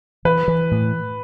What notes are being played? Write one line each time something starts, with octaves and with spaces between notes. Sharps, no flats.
E3 B4
E3
A2